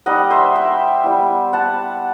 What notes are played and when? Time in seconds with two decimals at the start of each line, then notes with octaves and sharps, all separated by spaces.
0.06 G3 D#4 D#5 F#5
0.30 C5 E5
0.55 E5 G5
1.04 G3 B3 E4
1.53 F#5 A5